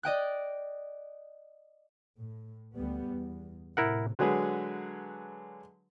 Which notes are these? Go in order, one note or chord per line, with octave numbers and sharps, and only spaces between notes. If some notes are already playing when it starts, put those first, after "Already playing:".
D5 D#5 G5 F#6
A2
D2 G3 B3
E2
A2 C3 E4 A#4 F#5
D3 F#3 G#3 G#4 B4